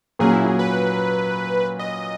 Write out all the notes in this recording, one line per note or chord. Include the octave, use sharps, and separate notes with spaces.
A#2 F#3 C#4 G#4
E4
G#4
B4
D#5